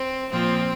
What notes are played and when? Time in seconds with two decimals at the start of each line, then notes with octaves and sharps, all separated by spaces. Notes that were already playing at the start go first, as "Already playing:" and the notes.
Already playing: C4
0.30 A#2 F3 C4